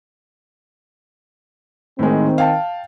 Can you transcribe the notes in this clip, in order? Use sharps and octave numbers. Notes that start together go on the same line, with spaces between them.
A2 D#3 G#3 C4
F5 G5 A5